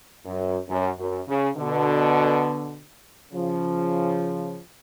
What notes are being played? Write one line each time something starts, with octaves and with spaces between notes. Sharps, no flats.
F#2
F#2
F#2
C#3
B2 D3
C#3 F3